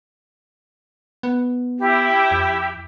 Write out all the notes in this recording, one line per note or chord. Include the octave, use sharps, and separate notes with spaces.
B3
E4 G4
F2